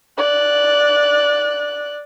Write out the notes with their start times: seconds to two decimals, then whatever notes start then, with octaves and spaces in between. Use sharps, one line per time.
0.18 D5 F#6